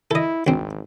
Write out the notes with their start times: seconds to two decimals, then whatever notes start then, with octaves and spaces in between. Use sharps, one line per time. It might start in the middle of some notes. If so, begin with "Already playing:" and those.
0.11 E4 A4 D#5
0.47 G#1 D2 C4